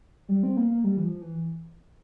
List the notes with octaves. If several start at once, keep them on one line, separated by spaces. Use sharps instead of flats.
G3
C4
A#3
A#3
G3
E3
F3
E3